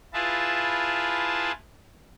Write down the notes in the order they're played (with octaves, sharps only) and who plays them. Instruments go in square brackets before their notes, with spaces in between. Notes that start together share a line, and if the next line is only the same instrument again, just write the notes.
[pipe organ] E4 F4 G#4 B4 A5